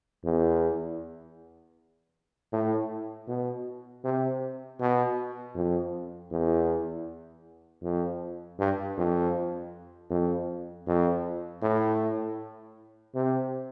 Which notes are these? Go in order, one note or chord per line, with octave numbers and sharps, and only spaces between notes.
E2
A2
B2
C3
B2
F2
E2
F2
G2
F2
F2
F2
A2
C3